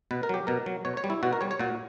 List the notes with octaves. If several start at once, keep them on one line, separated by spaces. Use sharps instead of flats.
B2 B4
A#4
F#3 G4
B2 A#4
F#3
B2 C#5
C#5
G3
E4
B2 F#4
A#4
G3 C#5
C#5
A#2 F#4